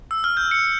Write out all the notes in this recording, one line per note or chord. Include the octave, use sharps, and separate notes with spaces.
E6
F6
G6
C#7